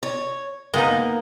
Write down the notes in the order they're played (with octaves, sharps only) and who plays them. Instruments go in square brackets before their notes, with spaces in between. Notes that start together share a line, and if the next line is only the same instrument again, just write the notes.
[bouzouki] C#5
[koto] G#3 B3 D#4 [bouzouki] A#3